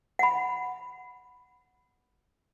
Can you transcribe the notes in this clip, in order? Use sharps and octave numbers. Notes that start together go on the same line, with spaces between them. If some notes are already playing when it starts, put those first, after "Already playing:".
F#5 B5